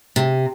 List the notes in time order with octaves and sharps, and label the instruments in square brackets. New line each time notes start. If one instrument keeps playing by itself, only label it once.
[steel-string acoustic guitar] C3